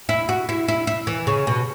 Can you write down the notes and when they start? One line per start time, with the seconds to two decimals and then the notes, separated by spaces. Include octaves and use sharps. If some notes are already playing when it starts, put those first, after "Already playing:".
0.09 E4
0.29 F#4
0.49 E4
0.68 E4
0.87 E4
1.07 E3
1.27 C#3
1.47 B2